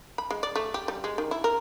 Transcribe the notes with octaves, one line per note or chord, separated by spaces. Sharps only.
B5
G#3
D5
A3
G4
G3
G#3
D#3
E4
A#4